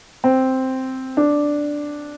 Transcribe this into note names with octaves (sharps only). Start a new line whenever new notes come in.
C4
D4